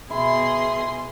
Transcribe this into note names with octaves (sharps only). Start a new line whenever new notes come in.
B2 E4 G#4 C6